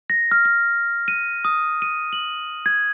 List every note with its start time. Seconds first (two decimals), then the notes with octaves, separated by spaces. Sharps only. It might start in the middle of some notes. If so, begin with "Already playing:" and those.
0.10 A#6
0.31 F6
0.45 F6
1.08 D#7
1.45 D#6
1.82 D#7
2.13 F#7
2.66 G#6